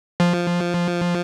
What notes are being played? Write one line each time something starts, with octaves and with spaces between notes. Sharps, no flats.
F3